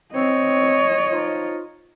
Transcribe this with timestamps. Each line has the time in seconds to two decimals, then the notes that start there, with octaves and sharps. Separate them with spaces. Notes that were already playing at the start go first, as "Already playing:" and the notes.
0.14 C4 C#5 D#5
1.11 F3 D#4 F4